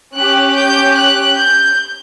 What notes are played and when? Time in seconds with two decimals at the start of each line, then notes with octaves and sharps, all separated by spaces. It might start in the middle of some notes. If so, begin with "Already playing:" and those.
0.15 C#4 G4 F#6
0.55 G6
0.95 F#6
1.34 G6